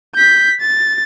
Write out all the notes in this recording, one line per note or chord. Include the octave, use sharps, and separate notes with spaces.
G6 B6
A6